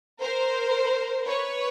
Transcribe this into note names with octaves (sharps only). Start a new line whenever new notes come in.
A#4 C5
B4 C#5